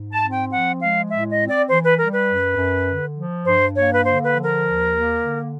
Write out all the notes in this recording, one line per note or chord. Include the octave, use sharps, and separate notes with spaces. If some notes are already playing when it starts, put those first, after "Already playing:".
Already playing: G#2
A5
C4
G5
F3 F#5
G#3 F5
A2 E5
D#5
C4
D5
E3 C5
B4
G3 A#4
B4
F#2
F#2
D3
F3
G2 C5
A#3 C#5
B4
D3 C5
B4
F3
A#4
D#2
A#3
D3